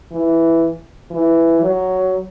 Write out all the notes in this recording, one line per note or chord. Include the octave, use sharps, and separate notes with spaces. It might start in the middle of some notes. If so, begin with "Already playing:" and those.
E3
E3
F#3